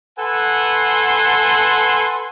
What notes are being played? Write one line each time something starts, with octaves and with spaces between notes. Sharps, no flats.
A4 B4 F#5 G#5 C6